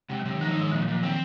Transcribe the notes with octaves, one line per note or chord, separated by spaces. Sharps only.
C3 G#3
F#3
C3
D#3
F3 D#4
D#3
G#3
D#3
A#2 F3
F#3
A#2 F3
D#3 C4